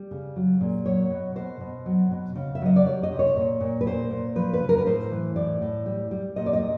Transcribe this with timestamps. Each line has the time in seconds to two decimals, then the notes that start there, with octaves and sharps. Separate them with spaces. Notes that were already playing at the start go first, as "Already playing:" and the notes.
Already playing: G3
0.11 C#3
0.36 F#3
0.61 A#2
0.85 F#3 C#5
1.10 B2
1.35 B2 C5
1.61 B2
1.86 F#3
2.11 B2
2.36 C#3
2.55 E5
2.62 F#3 D#5
2.76 D5
2.86 G3 C#5
3.03 D#5
3.11 C3
3.19 C#5
3.36 A#2
3.61 A#2
3.81 B4
3.87 A#2 C5
4.11 A#2
4.36 F3 B4
4.53 B4
4.61 C#3
4.69 A#4
4.78 B4
4.86 A2 C5
5.11 E3
5.36 A2 D5
5.62 A2
5.86 G3
6.11 G3
6.36 A#2 D#5
6.46 D5
6.53 D#5
6.61 A#2